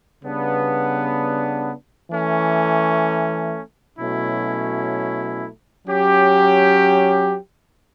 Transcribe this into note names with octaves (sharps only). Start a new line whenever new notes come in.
C#3 G3 B3 D4
E3 A3 C#4
B2 F#3 A3 C#4 E4
F#3 C#4 G4